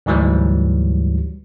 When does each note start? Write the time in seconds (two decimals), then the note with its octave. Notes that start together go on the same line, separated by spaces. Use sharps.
0.06 D2 G#2 E3 F#3 G3